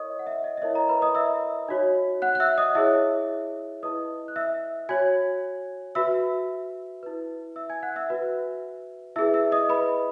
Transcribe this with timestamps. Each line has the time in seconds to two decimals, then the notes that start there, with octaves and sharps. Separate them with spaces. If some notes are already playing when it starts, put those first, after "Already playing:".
Already playing: E4 A#4 C#5 D#5 C#6 D#6
0.19 F#5
0.27 E5
0.44 D#5
0.57 E5
0.62 E4 A#4 C#5 D#5
0.75 A#4 A#5
0.89 B4 B5
1.02 D#5 D#6
1.15 E5 E6
1.69 D#4 F#4 C#5
2.22 F#5 F#6
2.35 F#6
2.40 E5 E6
2.58 D#5 D#6
2.75 E4 G#4 C#5 E5 E6
3.82 E4 B4 D#5 D#6
4.28 F#6
4.36 E5 E6
4.89 F#4 C#5 G#5 G#6
5.95 F#4 B4 E5 E6
7.03 E4 B4
7.56 E5 E6
7.70 G#5 G#6
7.83 F#5 F#6
7.96 E5 E6
8.10 F#4 B4
9.16 E4 G#4 B4 E5 E6
9.34 E5 E6
9.52 D#5 D#6
9.69 B4 B5